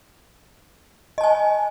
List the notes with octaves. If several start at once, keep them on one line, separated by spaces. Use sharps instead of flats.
D#5 G#5 A5